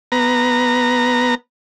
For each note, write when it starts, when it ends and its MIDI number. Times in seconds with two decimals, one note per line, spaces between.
0.12 1.35 59
0.12 1.35 82